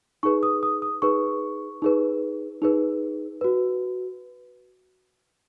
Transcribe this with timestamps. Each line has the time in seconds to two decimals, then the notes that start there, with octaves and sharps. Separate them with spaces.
0.23 D#4 G#4 B4 C#6
0.43 D#6
0.63 D#6
0.82 D#6
1.02 D#4 G#4 B4 C#6
1.82 D#4 G#4 B4
2.62 D#4 G#4 B4
3.41 F#4 B4